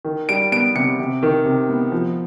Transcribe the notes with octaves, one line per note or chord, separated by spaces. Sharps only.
D#3
G3 D7
B3 D7
C3 C#7
C3
D#3
C3
B3
F3